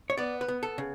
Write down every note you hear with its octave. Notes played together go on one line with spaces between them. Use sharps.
C#5
B3 D5
B4
B3
A4
C#3